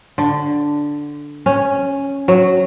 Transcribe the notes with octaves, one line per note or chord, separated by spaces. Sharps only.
D3
C#4
F#3